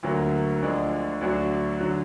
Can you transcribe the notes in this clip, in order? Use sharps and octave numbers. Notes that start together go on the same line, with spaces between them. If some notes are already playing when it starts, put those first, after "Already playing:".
D2 D3 F#3 A#3
D2 D3 F3 G#3 D4
D2 D3 F#3 D4 F#4
D3 F#3